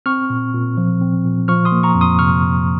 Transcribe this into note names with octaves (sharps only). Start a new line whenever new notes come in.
C4 C#6 F6
A#2
A#2
F3
C4
A#2
F3 C#6 F6
C6 D#6
A#3
A#5 C#6
F2
C6 D#6
C3 C#6 F6